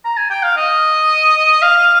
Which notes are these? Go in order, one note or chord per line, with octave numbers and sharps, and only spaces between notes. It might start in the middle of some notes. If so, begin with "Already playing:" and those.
A#5
G#5
G5
F5
D#5
F5